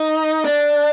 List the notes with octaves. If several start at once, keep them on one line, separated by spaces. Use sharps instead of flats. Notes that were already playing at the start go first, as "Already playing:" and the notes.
Already playing: D#4
D4